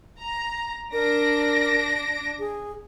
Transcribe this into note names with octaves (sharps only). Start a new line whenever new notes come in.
A#5
D4 A#4 A#6 D7
G#4